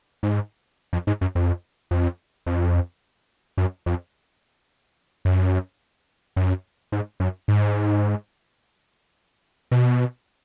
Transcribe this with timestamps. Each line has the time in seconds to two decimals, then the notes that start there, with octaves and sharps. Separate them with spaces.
0.23 G#2
0.93 F2
1.07 G#2
1.21 F#2
1.35 F2
1.91 F2
2.46 F2
3.58 F#2
3.86 F2
5.25 F#2
6.36 F#2
6.92 G#2
7.20 F#2
7.48 G#2
9.71 B2